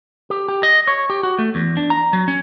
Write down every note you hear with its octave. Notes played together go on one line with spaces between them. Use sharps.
G4
G4
D#5
C#5
G4
F#4
A3
E2
D4
A#5
F#3
C#4